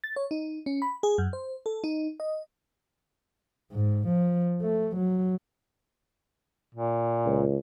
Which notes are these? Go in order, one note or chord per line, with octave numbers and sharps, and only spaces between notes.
A6
C#5
D#4
C#4
B5
G#4
F#2
C5
A4
D#4
D#5
G#2
F3
A3
F#3
A#2
C#2